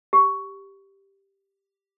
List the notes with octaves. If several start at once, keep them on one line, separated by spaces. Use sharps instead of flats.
G4